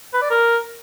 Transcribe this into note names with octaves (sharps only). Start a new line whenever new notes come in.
B4
D5
A#4